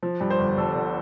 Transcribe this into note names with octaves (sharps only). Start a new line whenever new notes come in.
F3
G2
C5
G1
G1 A4
D3